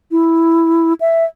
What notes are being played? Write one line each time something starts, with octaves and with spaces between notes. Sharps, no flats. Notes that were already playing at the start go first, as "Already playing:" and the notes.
E4
E5